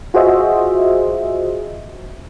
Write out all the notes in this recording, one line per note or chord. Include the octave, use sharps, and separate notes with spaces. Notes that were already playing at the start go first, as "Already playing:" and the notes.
F4 F#4 G#4 C5 D#5 E5